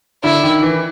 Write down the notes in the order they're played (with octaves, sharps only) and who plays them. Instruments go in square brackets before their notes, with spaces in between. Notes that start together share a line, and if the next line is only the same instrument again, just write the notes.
[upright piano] D3 [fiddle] E4
[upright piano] D#3
E3